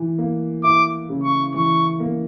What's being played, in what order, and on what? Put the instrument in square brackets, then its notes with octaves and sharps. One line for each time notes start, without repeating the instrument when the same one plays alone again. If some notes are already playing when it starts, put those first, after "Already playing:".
Already playing: [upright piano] E3
A#3
[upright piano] E4 [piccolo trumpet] D6
[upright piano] C#3
[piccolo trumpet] C#6
[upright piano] E3 [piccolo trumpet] C#6
[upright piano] A#3